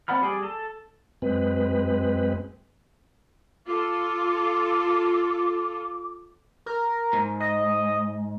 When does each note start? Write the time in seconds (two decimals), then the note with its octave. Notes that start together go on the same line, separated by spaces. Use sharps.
0.08 C4 D5 F#5 B5 F6
0.21 G3 G#4 D5
0.43 A4
1.22 F#2 G#3 C4 B4
3.67 F4 A4 D6
6.66 A#4
7.13 G#2
7.40 D#5